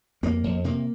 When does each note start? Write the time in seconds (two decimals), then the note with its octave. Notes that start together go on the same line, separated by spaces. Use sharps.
0.23 F2 A#3
0.44 F2
0.64 C3 A#3